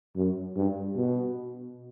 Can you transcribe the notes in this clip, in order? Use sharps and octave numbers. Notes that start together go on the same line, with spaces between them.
F#2
G2
B2